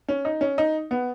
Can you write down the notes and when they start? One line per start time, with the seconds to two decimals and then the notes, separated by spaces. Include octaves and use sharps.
0.08 C#4
0.25 D#4
0.41 C#4
0.58 D#4
0.91 B3